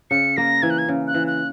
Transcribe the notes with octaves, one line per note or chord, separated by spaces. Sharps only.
C#3 C#7
A#3 A#6
E3 G#6
F#6
G#6
C#3
F#6
E3
F#6